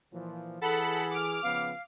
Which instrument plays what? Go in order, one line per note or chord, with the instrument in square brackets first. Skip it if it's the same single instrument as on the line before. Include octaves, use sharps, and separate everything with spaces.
[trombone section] A#2 E3 F3
[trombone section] E3 G#4 [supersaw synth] A4 B5 [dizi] F#5
[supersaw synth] D6 F6
[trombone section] C#3 F3 B3 [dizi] F5